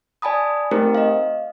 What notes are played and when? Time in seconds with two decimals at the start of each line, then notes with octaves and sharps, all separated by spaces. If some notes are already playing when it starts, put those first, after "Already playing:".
0.22 D5 G#5 A5 B5 D#6
0.71 A3 C4 D#4 G4 A#4 C5
0.95 D#5 F5